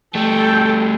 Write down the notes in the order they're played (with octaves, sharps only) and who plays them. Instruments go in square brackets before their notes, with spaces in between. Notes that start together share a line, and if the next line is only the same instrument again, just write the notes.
[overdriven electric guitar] G3 A3 [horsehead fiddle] A4 G5